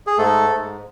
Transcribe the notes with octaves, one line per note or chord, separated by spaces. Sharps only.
G#4
G#2 A3 A4
G#2